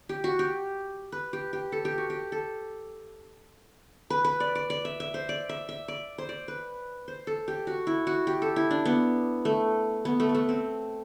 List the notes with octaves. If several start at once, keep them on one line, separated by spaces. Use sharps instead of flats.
G4
F#4
G4
B4
G4
G4
A4
G4
F#4
G4
A4
B4
B4
D5
D5
D5
E5
E5
C5
D5
E5
E5
D5
C5
D5
B4
C5
A4
G4
F#4
E4
F#4
G4
A4
E4
D4
B3
A3
B3
A3
B3
A3
C4